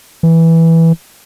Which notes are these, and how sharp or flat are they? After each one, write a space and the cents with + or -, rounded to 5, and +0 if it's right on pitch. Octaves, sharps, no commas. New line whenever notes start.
E3 -5